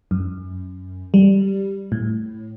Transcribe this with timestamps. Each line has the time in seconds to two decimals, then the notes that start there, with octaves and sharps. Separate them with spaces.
0.11 F#2
1.14 G3
1.92 A2